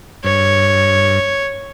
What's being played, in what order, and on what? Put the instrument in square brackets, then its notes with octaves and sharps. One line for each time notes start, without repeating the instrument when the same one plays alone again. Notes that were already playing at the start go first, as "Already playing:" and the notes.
[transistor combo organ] G2 [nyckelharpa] C#5